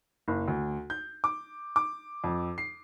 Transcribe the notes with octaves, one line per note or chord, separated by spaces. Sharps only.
F#1
D2
G6
D6
D6
F2
C7